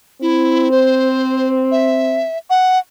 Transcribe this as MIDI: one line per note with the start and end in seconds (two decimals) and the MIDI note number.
0.22 2.25 60
0.22 0.69 64
0.71 1.49 72
1.71 2.38 76
2.50 2.79 78